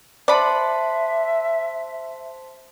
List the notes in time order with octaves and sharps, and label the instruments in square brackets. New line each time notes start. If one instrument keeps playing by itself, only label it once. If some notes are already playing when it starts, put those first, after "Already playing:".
[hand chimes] C5 A5 C6 [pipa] D5 B5 [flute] E5